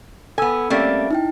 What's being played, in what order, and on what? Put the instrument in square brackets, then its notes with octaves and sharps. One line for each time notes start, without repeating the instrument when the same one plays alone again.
[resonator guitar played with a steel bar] B3 G#5 [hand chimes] A4 E6
[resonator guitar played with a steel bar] G3 A3 A#3 [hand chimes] C4 C#4 E5
[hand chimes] D#4 E4 G5